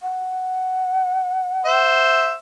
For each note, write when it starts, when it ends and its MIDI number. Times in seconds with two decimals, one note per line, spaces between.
0.02 2.29 78
1.65 2.34 72
1.65 2.34 76